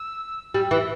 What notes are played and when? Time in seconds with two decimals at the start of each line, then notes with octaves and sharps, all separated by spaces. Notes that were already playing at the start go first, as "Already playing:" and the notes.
Already playing: E6
0.54 G3 E6
0.71 E3 E6